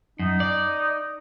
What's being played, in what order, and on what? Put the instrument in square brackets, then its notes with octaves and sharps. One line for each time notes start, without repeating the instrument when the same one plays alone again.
[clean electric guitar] F#2 [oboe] D#4
[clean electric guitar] D5